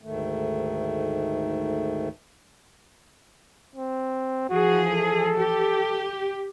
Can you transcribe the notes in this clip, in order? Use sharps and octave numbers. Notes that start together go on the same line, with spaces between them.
D2 G#2 D#3 A3
C4
E3 F3 F#4 G#4
A4
G4